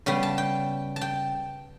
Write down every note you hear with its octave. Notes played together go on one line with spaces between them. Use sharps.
C#3 G3 B3 G5
A5
G5
A5
G5